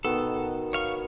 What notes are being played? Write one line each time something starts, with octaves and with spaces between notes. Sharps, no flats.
B2 D#3 B3 A4
C#5 F5 C#6